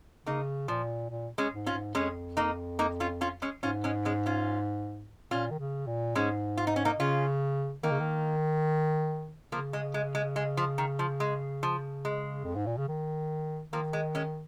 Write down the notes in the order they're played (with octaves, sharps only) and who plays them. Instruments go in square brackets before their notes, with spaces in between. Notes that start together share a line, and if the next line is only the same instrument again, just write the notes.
[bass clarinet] C#3 [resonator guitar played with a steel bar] A#3 D#4
[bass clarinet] A#2 [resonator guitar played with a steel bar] F3
[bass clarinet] A#2
[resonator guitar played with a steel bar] G#3 C#4
[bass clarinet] G#2
[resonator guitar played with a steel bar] C#4 F4
[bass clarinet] G#2
[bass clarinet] F2 [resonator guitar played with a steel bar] G#3 C#4
[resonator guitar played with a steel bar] A#3 D#4
A#3 D#4
C#4 F4
C#4 F4
G#3 C#4
[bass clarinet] G#2 [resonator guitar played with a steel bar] C#4 F4
[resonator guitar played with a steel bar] G#3 C#4
G#3 C#4
C#4 F4
[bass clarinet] A#2 [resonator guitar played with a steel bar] C#4 F4
[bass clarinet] D#3
C#3
A#2
[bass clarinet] G#2 [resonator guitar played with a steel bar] G#3 C#4
[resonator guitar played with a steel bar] F4
D#4
C#4
A#3 D#4
[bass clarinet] C#3 [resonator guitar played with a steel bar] C#4 F4
[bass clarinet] D#3 [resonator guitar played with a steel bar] A#3 D#4
[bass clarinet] C#3
D#3
[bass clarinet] C#3 [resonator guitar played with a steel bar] F3 A#3
[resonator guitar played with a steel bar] G#3
G#3
G#3
G#3
F3
D#3
F3
G#3
F3
G#3
[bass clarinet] F2
G#2
A#2
C#3
D#3
[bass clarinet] D#3 [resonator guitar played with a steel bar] F3 A#3
[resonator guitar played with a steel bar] G#3
G#3 C#4